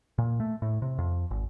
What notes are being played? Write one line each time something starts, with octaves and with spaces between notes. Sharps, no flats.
A#2
A3
A2
C3
F2
G#1